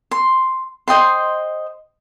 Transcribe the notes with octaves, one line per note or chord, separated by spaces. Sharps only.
C6
C5 D#5 G5 C6